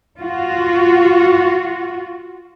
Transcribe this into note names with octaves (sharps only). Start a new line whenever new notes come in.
F4 F#4